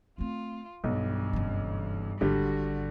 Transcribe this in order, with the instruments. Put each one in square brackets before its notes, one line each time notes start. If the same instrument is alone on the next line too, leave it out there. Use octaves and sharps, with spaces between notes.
[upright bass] A3 C4 [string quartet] F4
[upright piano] B1 [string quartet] G2 [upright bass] E3
[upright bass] F#1 E3
[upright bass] G#1 G#2 [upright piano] D3 G3 [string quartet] F#4